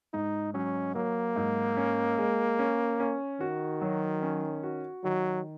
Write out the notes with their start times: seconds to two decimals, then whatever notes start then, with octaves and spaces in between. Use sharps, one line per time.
0.13 G#2 D#4
0.54 F#3 C#4
0.95 F#3 A#3
1.36 G#2
1.77 C#4
2.18 G#3
2.59 C#4
3.00 C#4
3.40 D#3 F#4
3.81 F#3
4.22 C#4
4.63 F#4
5.04 D#3 F#3